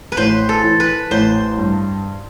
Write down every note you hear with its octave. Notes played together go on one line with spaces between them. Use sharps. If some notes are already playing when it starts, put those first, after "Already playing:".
B4
A1 C5
A4
E3
B4
A1 C5
G2